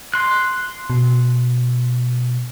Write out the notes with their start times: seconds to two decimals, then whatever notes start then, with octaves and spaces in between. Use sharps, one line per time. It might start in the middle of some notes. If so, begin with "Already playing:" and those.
0.14 C6 F#6
0.90 B2